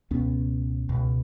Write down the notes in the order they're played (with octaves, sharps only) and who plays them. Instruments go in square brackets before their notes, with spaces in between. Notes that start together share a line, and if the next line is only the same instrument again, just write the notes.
[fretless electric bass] C#2 B2 B3 C#4
C#2 B2